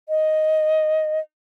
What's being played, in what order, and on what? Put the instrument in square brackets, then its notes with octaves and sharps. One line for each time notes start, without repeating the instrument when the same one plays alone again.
[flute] D#5